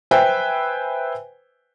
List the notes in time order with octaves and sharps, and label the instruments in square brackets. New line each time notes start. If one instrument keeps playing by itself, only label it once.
[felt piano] B4 C5 E5 G5 G#5